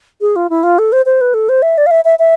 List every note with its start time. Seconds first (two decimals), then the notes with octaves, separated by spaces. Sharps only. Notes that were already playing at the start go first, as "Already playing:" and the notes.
0.21 G#4
0.36 F4
0.50 E4
0.63 F4
0.79 A4
0.92 C5
1.06 C5
1.21 B4
1.34 A4
1.49 C5
1.62 E5
1.78 D5
1.86 F5
1.91 E5
2.05 E5
2.19 E5